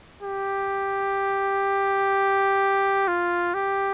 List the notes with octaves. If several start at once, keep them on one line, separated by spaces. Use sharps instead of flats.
G4
F4
G4